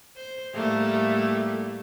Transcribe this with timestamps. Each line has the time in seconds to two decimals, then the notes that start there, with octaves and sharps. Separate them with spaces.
0.16 C5
0.54 A2 G3 A3 A#3 A4